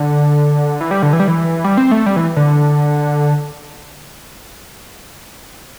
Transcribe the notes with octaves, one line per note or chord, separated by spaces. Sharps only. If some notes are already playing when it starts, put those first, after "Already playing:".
Already playing: D3
E3
G3
D3
E3
G3
E3
G3
C4
A3
G3
E3
D3